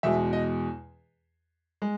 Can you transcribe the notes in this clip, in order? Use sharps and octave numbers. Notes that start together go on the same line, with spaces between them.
E2 B2 G#3 E5
D#5
G#3